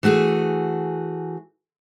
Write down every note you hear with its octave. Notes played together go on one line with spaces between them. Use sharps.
E3 A3 F#4 G#4